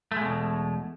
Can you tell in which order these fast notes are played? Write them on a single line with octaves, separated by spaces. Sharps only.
A3 G#3 B2 E2